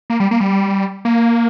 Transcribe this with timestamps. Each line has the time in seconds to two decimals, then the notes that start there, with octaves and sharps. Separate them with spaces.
0.10 A#3
0.20 G3
0.31 A#3
0.40 G3
1.05 A#3